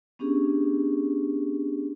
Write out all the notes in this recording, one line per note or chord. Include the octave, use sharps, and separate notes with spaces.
B3 C#4 D4 G4 G#4